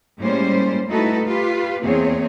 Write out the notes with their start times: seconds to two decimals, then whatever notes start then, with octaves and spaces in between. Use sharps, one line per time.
0.19 A2 G3 G#3 A#3 C#4 C5
0.88 A3 D#4 E4 F#4 A4 B4
1.25 F4 G4 B4
1.83 E2 A#3 C4 G#4 C#5